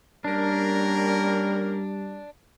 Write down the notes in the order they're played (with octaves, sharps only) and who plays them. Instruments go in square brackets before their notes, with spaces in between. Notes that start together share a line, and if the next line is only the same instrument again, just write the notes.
[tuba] G3 [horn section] A#3 C#4 A#4 [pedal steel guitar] D4